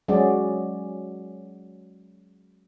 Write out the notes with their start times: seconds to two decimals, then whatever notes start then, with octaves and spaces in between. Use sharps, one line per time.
0.08 F#3 G#3 C#4 F#4 G#4 D5